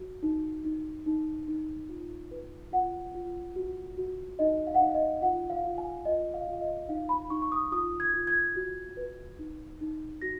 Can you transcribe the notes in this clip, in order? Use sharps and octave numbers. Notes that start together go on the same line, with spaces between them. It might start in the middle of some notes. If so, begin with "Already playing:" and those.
Already playing: F#4
D#4
D#4
D#4
D#4
F4
B4
F4 F#5
F4
F#4
F#4
D#4 D#5
F5
F#5
D#4 F5
D#5
F4 F#5
F5
F4
G#5
F4 D#5
F5
F4
F5
D#5
D#4 F5
B5
D#4 C#6
C#6
D#6
F4 D#6
G#6
F4
G#6
F#4
B4
D#4
D#4
F#4 A#6